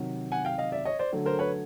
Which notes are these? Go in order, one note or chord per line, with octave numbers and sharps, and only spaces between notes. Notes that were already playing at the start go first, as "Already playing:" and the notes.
Already playing: C3 D#3 F#3
F#5 G#5
F5 G5
D#5 F5
D5 E5
C#5 D#5
C5 D5
D3 F#3 A3
A#4 C5
B4 C#5